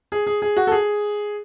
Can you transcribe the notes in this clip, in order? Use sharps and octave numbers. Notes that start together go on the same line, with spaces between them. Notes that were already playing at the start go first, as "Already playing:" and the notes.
G#4
G#4
G#4
F#4
A4
G#4